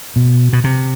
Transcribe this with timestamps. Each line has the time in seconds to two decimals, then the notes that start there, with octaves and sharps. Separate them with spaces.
0.16 B2
0.53 B2
0.64 C3